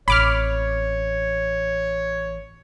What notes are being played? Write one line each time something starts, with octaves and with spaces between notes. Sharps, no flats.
A1 C4 C#5 B5 D6 F6